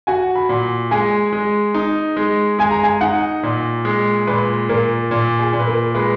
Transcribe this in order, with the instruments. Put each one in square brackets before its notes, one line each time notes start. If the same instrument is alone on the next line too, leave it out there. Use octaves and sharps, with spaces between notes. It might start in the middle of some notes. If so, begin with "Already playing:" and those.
[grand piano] F#4 [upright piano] G#5
[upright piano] B5
[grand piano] A#2
[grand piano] G#3 [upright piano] G#5
[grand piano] G#3
D#4
G#3
[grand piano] G#3 [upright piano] G#5
[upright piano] A#5
G#5
[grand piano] D#4 [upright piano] F#5
[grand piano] A#2
G#3
[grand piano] A#2 [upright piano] B4
[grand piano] A#2 [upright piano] A#4
[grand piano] A#2
[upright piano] G#4
[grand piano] A#2
[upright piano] B4
A#4
[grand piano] G#3 [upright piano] B4